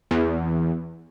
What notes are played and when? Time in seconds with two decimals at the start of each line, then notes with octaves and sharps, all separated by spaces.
0.11 E2